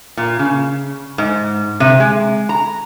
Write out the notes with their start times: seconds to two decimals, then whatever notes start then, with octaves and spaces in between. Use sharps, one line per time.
0.17 A#2
0.39 C#3
1.18 G#2
1.80 C3
2.00 G#3
2.49 A#5